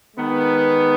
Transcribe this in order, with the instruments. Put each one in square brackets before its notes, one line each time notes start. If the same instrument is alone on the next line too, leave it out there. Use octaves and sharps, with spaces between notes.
[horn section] D#3 G#3 B3